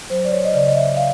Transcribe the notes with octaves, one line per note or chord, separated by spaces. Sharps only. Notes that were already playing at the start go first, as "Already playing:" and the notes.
F#3 C5
D5
C#5
D#5
C#3 D5
D#5
E5
F5